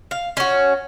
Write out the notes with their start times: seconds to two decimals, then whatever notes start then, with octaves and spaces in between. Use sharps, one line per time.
0.11 F5
0.37 C#4 F#4